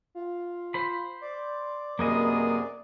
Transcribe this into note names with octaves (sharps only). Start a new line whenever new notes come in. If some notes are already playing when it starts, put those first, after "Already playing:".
F4
C5 B5
D5
F#2 C3 A#3 B3 G#4 D#5